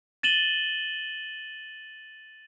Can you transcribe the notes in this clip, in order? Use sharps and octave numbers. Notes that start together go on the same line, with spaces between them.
A6 D#7 E7 F#7 G7